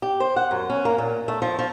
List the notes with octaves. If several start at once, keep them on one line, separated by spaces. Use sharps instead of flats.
G4
C5
F#5
F#2
C#4
A#3
A#2
A3
F3
F3